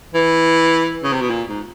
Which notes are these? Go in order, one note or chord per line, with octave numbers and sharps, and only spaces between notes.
E3
C#3
C3
B2
A#2
G#2